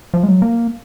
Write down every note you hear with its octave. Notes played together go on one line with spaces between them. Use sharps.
F3
G#3
F#3
A#3